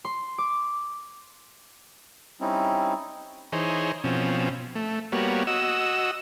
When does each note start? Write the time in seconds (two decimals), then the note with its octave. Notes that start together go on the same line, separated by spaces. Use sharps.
0.05 C6
0.38 D6
2.41 G3 C4 C#4 D#4 E4
3.52 E3 D#4 G#4 C5 C#5
4.04 B2 F3 C4 C#4
4.75 A3
5.12 G3 A#3 B3 F#4 C#5
5.47 F#4 D#5 E6